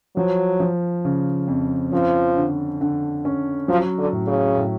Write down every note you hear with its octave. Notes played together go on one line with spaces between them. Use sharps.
F3 F#3
F3
C#3
F2
F3 C#4
D3
D3
C#4
F3 F#3
D3
A2
C#3
A2